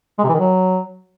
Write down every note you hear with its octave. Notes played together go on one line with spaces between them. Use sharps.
G#3
C3
E3
D#3
F#3